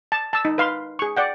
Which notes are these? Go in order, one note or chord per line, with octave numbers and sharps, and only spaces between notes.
A5
A5 E6
D#4
B4 F5 C6
G#4 C#6
D5 F#5 G5